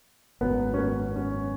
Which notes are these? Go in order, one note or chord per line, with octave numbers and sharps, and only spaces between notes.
G#1 F#2 D#3 F#3 B3
C#4
B3
C#4